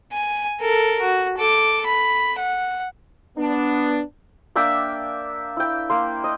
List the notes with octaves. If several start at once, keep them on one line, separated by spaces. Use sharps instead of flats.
G#5
A4 A#4
F#4
A4 D6
B5
F#5
B3 D4
A#3 D4 E5 G5
E4 G5
A#3 C6
D#5